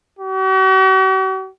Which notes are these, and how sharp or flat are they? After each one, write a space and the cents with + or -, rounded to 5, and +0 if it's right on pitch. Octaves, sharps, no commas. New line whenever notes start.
F#4 +45